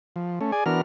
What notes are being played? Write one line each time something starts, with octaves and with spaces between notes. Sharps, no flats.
F3
A3 C#4
G#4 D5 G#5
E3 B3 D4 F#4 A#4 F6